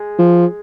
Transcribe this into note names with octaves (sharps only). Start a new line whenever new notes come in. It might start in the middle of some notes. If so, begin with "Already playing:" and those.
Already playing: G#3
F3